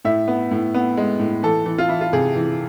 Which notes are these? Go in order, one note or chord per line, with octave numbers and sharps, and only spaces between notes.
A2 E5
B3
A2
B3
G#3
A2
E3 A4
E3
F4
E3 E4
F4
C3 G#4
E3